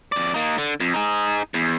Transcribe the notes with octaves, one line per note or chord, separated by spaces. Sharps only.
F2 D5
A#3 D#4
D3
F2
D#4 G#4
E2